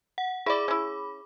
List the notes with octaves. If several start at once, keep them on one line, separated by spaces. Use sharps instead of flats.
F#5
E4 G#4 D5 B5 D6
C#4 E4